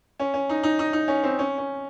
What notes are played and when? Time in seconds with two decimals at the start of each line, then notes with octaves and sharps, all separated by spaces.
0.20 C#4
0.34 C#4
0.49 D#4
0.63 D#4
0.79 D#4
0.93 D#4
1.08 C#4
1.24 C4
1.39 C#4
1.58 C#4